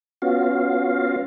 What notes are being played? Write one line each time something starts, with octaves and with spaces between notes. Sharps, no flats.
B3 C#4 F4 F#4 F5